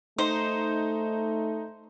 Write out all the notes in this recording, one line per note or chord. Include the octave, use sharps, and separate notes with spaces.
A3 D#4 C5